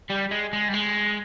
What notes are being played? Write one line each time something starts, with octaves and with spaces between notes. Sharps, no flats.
G3
G#3
G#3
G3
G#3